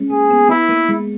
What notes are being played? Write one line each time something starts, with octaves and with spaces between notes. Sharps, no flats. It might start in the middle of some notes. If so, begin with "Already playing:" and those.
Already playing: G#3 C#4
A#3 G#4
B3
B3 E4
A#3
G#3